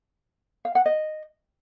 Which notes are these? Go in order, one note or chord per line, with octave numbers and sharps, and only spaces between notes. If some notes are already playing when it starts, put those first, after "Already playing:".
F5
F#5
D#5